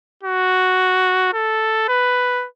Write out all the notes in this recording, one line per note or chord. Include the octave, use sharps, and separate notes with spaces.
F#4
A4
B4